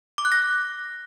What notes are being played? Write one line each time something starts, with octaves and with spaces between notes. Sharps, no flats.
D6
F#6
A#6